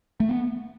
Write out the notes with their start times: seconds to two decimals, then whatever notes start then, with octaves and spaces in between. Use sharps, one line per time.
0.20 A3
0.29 B3